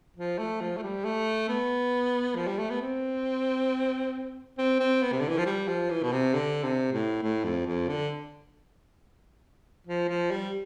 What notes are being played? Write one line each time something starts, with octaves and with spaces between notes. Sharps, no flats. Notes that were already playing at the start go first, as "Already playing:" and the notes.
F3
A3
F3
A3
G3
A3
B3
F3
G3
A3
B3
C4
C4
C4
B3
C3
D3
E3
F3
G3
F3
E3
B2
C3
D3
C3
A2
A2
F2
F2
D3
F3
F3
G3